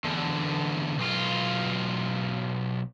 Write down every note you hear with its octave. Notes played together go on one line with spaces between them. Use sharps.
E2 D3
B1 F4